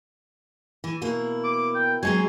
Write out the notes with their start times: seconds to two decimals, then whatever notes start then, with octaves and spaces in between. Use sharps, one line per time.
0.84 E3
1.02 B2 A#3 E4
1.44 D6
1.75 G5
2.03 F#3 G#3 C4 G#5